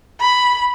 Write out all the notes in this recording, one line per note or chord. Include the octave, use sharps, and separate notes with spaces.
B5